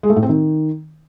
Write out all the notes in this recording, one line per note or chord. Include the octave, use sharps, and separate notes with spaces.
G#3
A3
A2
C4
D#3